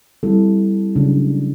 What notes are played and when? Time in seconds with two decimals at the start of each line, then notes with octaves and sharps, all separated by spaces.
0.23 G3 C4 E4 A4
0.95 C#3 F#3 A3 D4